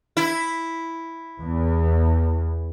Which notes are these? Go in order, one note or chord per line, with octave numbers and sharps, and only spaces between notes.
E4
E2